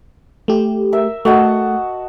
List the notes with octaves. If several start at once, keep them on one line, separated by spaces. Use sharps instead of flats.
A3 G4
A#4 E5
A3 F#4 D#5 A5